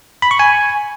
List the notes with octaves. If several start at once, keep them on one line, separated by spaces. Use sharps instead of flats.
B5
C#6
G#5